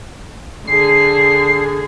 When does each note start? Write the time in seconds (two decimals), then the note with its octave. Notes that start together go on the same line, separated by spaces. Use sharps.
0.67 D3 G#4 C7